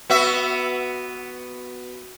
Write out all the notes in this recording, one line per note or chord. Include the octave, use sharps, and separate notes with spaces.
B3 F#4 E5